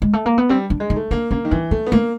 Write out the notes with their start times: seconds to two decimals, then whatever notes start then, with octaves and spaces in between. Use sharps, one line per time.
0.02 G#3
0.13 A3
0.26 A#3
0.38 B3
0.49 G3 C4
0.70 D4
0.80 G#3
0.90 D#4
0.96 A3
1.11 A#3 D4
1.31 A#3 C#4
1.45 D#3
1.51 E3 C4
1.71 A3 B3
1.86 B3
1.92 A3 A#3